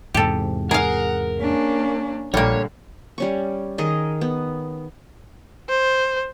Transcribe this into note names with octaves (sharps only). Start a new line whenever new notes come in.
E2 G#2 C3 G4 A4
G#4 A#4 F5 F#5
A#3 C#4 D4
A#1 A#2 D3 G3 A#3 C#5
G3 C#4 C#6
D#3 G#4 A#4 D#5
B3
C5